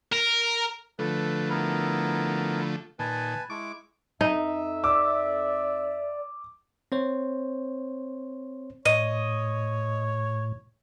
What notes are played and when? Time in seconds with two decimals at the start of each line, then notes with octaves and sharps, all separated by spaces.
0.13 A#4
0.99 D3 F3 A3 A4 B4
1.49 B3 E4 A#4
2.99 A#2 D#3 B4 G#5 A5
3.50 G#3 E4 C#6 D6
4.21 F2 D#4 E5
4.84 D5 D6 E6
6.92 C4 C5 C#5
8.85 A2 C#5 D#5